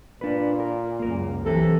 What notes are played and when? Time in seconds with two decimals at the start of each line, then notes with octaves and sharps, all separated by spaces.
0.21 A#2 D4 B4
0.60 A#4
1.00 C#2 F#2 A#3 A#4
1.45 C2 C3 E3 F#3 A4